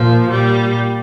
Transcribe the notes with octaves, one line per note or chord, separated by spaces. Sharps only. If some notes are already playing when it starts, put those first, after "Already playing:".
Already playing: A#2 F3
A#2 G3